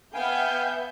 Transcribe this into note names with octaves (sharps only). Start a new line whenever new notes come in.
B3 E5 F5 G5 G#5 G6